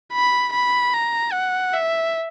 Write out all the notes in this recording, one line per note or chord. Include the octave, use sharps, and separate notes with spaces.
B5
B5
A#5
F#5
E5